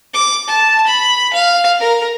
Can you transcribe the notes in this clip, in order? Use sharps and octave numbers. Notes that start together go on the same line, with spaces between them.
D6
A5
B5
F5
A#4